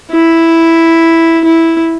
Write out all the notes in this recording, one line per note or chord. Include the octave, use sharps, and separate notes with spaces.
E4
E4